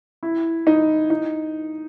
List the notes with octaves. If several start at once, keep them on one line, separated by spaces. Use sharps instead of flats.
E4
D#4
D#4